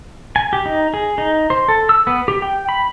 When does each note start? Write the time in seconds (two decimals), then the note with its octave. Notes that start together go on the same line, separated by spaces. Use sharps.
0.36 G#5
0.53 G4
0.66 D#4
0.94 G#4
1.18 D#4
1.50 C5
1.68 A4
1.89 E6
2.07 B3
2.28 G4
2.42 G5
2.69 B5